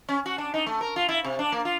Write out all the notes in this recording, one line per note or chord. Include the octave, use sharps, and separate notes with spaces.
C#4
F#4
D4
D#4
A3
A#4
F4
E4
C3
D4
A#3
F4